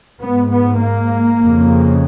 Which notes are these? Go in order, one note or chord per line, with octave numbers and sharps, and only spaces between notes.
G#2 B3
B3
A#3
F2 C#3